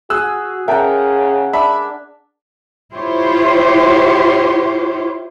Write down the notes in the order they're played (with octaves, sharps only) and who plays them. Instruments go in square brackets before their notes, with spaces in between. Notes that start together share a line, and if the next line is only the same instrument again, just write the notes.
[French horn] F#4 [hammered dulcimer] G#4 [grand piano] E6 [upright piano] F#6
[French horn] C#3 [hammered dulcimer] A#4 F#5 [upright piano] E5 G5 A5
[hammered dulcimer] D4 [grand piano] E5 B5
[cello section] E4 F4 G4 C5 C#5